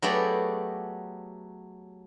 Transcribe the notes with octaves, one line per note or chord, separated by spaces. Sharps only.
F#3 A3 B3 G4 G#4 D5